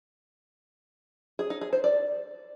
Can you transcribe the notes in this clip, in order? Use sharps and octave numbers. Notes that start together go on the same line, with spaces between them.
G#4
D#4
G#4
C5
D5